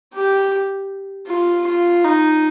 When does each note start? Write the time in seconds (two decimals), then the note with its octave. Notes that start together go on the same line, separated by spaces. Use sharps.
0.14 G4
1.28 F4
1.67 F4
2.04 D#4